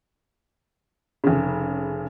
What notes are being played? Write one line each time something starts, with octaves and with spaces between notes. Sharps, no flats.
F1 C#3